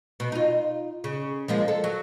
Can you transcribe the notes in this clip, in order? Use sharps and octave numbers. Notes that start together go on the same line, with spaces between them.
B2
D#4 F4
C#3
F3 G#3 A#3
A4
F#3